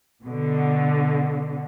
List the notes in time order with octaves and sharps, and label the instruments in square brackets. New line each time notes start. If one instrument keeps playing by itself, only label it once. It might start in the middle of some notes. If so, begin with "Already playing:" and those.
[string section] B2 D3